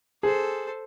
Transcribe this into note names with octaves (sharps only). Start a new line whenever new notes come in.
G#4 A4 C5